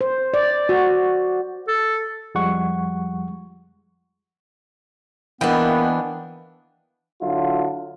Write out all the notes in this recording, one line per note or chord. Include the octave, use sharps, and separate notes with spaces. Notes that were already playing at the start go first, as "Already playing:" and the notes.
C5
D5
F#4
A4
F2 F3 G3 G#3 F#5 C#6
E3 A#3 B3 D4 D#5 F5 G5
D3 F#3 E4 F4